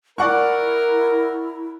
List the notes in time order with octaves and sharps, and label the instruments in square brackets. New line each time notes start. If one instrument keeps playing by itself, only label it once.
[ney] E4 [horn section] A#4 [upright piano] D5 F#5 C#6